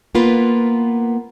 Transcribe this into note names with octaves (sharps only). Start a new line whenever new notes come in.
A#3 B3 F4 B4